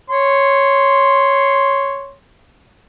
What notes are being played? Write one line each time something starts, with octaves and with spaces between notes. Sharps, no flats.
C#5 C6